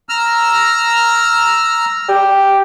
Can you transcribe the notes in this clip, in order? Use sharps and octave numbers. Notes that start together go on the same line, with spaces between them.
A#5 E6 F6
G4